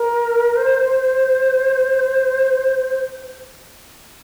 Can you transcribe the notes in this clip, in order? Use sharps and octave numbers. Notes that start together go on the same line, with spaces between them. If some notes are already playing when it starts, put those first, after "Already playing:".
Already playing: A#4
C5